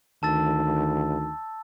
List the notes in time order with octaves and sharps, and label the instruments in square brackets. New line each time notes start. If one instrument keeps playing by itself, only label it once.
[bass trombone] D2 [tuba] D#3 [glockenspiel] A5 E6 A6